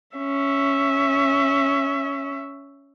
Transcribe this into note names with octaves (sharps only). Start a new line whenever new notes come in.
C#4 E5